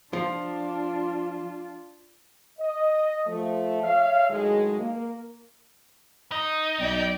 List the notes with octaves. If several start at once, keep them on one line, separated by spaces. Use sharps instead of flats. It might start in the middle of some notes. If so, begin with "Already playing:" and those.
F3 D4 F4
D#5
F3 A3
C#5 E5 F5
A2 D#3 F#3 G#3
A#3
D#4
B1 D5 G5